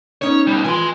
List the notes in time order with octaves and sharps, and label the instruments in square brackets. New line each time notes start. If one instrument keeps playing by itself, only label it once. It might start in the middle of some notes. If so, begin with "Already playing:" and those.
[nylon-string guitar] B3 C#4 D#4 [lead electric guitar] C#5
[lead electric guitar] B2 G3
[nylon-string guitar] E3 F3 F4 [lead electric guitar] G#5 C6